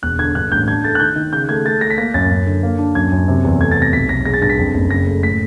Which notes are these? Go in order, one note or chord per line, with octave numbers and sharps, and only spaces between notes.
E1 F#6
D3 G#6
G2 F#6
A1 G6
D4 G#6
A3 A6
F#6
D#3 G6
D#3
C#3 G6
A3 G#6
A3 A6
A3 A#6
B6
A#3 A#6
F#2 A6
F#2
D3
A#3
D4
F#2 G#6
F#2
C3
E2
A3 G#6
A6
C3
A#6
B1 B6
B1 A#6
G#3 A#6
A6
G2 A#6
B6
F2
F#1
C#3 A#6
A3
A2 B6